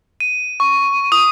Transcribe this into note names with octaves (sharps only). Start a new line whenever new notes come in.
D#7
C#6
D#6